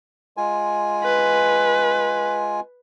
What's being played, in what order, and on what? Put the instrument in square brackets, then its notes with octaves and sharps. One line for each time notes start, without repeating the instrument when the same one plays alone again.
[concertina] G#3 F4 G#5
[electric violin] B4